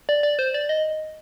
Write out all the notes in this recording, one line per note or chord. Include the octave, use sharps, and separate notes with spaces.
D5
D5
C5
D5
D#5